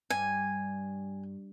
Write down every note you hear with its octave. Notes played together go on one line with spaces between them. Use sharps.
G2 G#5